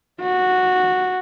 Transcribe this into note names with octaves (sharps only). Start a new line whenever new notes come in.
F#4